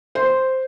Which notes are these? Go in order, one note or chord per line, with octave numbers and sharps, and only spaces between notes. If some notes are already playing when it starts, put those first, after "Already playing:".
C5